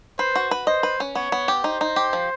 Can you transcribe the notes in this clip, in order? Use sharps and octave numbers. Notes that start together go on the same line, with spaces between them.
B4 C5
F#4
B4
C5 D#5
B4
C#4
B3 C#5
B3
G4
D#4 C5
D#4
G4
F3